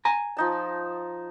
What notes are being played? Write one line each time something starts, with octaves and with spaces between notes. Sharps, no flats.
G#5 A#5
F3 D#4 A5